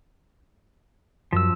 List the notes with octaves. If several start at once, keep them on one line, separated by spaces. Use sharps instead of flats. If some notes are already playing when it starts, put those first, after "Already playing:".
F#2 F3 E6